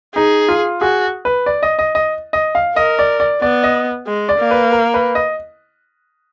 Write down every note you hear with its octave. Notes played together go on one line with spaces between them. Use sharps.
D#4 G#4
F4
F#4 G#4
B4
D5
D#5
D#5
D#5
D#5
F5
A#4 D#5
D5
D5
B3 D5
D#5
G#3
D5
A#3
B4
A#4
B4
D#5